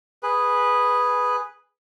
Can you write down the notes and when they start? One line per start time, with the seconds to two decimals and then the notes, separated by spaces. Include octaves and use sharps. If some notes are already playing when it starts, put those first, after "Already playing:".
0.23 G#4 B4